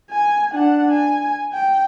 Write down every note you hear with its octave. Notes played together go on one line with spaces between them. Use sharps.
G#5
D4 F#5
G#5
G5